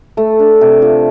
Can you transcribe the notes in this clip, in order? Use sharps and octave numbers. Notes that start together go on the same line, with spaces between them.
A3
D4
C3
F4